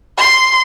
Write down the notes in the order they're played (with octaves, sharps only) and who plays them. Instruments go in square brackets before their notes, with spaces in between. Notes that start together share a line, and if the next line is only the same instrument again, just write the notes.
[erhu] C6